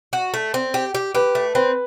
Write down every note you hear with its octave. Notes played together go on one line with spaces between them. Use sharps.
F#4
A3
C4
G4
G4
G4 B4
A3
C4 B4